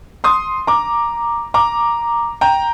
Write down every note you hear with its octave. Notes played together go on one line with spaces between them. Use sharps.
C6 D#6
A#5 D6
A#5 D6
G5 A#5